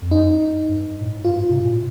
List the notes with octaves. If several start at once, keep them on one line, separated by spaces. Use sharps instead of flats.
F2
F#2 D#4
G2
A2
G#2
G2 F4
C3
B2
A#2
A2